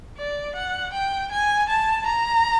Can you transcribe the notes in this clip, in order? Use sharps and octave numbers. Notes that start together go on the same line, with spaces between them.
D5
F#5
G5
G#5
A5
A#5